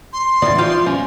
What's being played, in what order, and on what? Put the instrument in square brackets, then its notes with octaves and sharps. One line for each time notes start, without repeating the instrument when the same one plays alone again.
[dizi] C6
[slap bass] A2 C#3 [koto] E3 G3 B3 [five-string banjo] D5
[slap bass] F3 [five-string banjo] F4 G4 [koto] C5 F5 G5
[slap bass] G2 B2 [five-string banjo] C#4